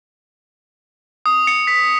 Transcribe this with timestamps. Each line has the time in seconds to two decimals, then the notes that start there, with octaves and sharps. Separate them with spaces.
1.26 D#6
1.47 C#7
1.67 B6